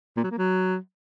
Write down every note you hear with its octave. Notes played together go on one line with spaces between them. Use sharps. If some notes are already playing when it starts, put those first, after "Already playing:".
A#2
F#3
A#3
F#3